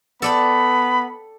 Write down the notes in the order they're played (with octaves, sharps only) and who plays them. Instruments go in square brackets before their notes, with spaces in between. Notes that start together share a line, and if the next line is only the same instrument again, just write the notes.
[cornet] B3 [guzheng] A4 D5 G5 [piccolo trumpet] B5